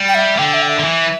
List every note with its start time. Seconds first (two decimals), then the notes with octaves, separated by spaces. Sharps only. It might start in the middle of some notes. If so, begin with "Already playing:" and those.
Already playing: G3
0.08 G5
0.15 E5
0.38 D3 G5
0.54 E5
0.62 G5
0.69 E5
0.79 D3
0.84 E3